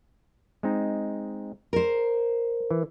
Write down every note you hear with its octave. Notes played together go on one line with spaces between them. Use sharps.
G#3 C4 D#4
A#4 C5 A#5
E3